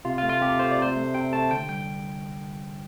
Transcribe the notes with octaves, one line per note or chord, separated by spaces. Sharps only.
C3 F4
F4
A3
F4
C3 G4
A3 C5
D5
C3 C5
A3
C3 G5
A3 A5
D3 G5
G3 G5